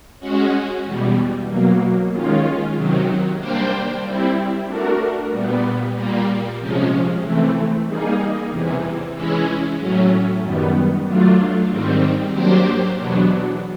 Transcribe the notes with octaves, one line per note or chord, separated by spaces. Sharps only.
G#3 C#4 F#4
E2 B2 G3
B2 F#3 A#3
D#3 G#3 C#4 F4
C3 D#3 F#3
G3 A#3 D4 G4 C5
G3 C4 E4
A3 D4 F#4 A#4
A#2 G3 B3
A#2 G3 A#3
C3 F3 G#3 C#4
E3 A3 C4
G3 A#3 D#4 G#4
E2 C3 E3
E3 G#3 C#4 E4
A2 F#3 A3 C#4
F#2 D#3 G3 B3
F#3 A3 D4 F4
G#2 D#3 G3 C4
F#3 A#3 D4 G4 C5
E2 B2 F#3 B3 D4